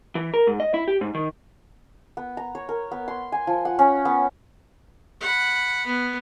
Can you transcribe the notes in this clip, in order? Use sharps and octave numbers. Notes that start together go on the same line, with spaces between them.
E3
A#4
G#2
D#5
E4
G4
G#2
D#3
B3
A#5
C#5
A#4
B3
C6
G#5
F3
F#5
C#4
B3
F#5 B5
B3